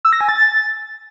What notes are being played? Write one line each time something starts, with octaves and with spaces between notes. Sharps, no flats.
E6
A#6
G#5
A6